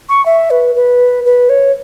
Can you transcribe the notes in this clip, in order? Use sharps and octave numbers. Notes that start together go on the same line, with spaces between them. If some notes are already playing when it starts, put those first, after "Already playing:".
C#6
E5
B4
B4
B4
C#5